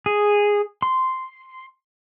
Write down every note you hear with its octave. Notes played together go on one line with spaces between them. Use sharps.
G#4
C6